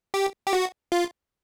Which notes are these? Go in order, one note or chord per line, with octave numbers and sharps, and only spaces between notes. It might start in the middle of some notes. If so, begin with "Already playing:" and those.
G4
G4
F#4
F4